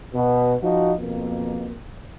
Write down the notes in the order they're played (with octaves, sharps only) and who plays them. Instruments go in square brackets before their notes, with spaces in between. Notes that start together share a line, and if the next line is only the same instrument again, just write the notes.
[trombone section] B2
F3 D#4 F#4
F2 B2 A#3